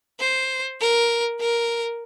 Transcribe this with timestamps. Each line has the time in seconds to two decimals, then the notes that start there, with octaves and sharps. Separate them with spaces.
0.20 C5
0.80 A#4
1.40 A#4